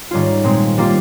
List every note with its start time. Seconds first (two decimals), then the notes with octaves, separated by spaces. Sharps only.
0.11 G#2 D#3 G3 C#4 F4
0.44 A#2 G#3 C4
0.78 G3 A#3 F4